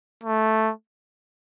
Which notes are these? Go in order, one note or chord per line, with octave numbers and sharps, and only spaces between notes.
A3